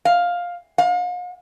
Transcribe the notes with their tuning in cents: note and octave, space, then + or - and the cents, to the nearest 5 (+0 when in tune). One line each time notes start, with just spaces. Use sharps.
F5 +10
F5 +45